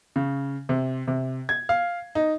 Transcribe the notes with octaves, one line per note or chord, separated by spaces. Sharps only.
C#3
C3
C3
G#6
F5
D#4